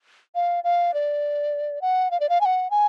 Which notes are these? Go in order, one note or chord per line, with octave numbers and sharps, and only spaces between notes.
F5
F5
D5
F#5
F5
D5
F5
G#5
F#5
G#5